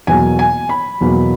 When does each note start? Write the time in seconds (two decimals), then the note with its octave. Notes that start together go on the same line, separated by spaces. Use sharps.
0.07 E2 B2 F#3 A#3 G#5
0.39 G#5
0.69 B5
1.01 E2 B2 F#3 A#3